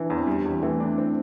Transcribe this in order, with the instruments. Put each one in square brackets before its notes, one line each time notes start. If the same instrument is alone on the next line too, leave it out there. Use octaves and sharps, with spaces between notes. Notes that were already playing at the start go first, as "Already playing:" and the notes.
Already playing: [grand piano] E3 [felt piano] D4 E4
[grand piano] E2
[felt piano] C4
[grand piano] G3 [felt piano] D4
[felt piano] E4
[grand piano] E2
[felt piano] C4
[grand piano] E3 [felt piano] A3
[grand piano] D4
C4